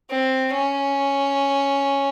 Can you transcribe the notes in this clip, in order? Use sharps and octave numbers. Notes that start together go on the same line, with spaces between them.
C4
C#4